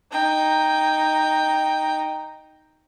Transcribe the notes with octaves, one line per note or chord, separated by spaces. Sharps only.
D#4 G5